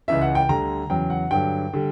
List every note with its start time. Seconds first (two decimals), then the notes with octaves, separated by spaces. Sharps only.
0.08 C#2 C#3 E3 E5
0.22 F#5
0.35 G5
0.49 D2 D3 G3 A#5
0.90 E2 C#3 F#3 G5
1.10 F#5
1.31 G2 D3 F#3 G5
1.73 D3 G3